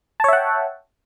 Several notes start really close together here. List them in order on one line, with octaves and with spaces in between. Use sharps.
A5 C#5 E5 F#5 G5